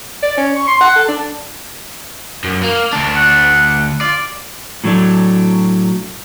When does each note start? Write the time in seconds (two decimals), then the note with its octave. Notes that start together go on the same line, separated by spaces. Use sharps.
0.23 D5
0.37 C#4
0.56 C#6
0.68 C6
0.81 F#5
0.96 A4
1.08 D4
2.44 F#2
2.62 A#3
2.93 D2 D4
3.15 F#5
4.01 F4 D5
4.84 A2 F#3 A3 D4